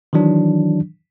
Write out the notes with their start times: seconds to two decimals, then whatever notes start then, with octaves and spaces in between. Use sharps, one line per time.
0.13 D#3 E3 F#3 D4